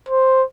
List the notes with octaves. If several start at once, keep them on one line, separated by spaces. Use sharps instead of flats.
C5